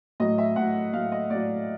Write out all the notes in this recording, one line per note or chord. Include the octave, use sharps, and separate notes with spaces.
A2 F#3 D#5
E5
A2 F#3 F#5
A2 F#3 F5
D#5
A2 F#3 D5